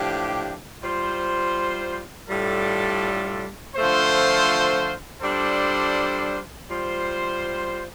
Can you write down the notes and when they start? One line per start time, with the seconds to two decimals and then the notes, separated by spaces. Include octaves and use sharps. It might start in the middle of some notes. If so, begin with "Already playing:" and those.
Already playing: A2 F3 D4 G4
0.84 G3 F4 C5
2.29 A2 G3 D4 F4 A4
3.76 D3 F3 A3 F4 C5
5.22 G3 D4 F4 A4 C5
6.69 G3 F4 C5